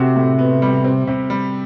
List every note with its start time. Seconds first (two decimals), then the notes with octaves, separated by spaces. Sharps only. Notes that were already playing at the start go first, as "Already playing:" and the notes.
Already playing: C3 A3 F#4
0.16 A2
0.39 B3
0.62 G3
0.84 C4
1.07 C3
1.30 G3